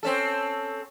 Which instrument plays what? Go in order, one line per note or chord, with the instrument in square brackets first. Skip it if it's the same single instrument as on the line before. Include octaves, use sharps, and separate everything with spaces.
[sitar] C4 C#4 A4